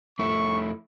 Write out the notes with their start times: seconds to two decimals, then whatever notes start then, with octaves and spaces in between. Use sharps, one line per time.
0.19 F2 A3 E4 C#6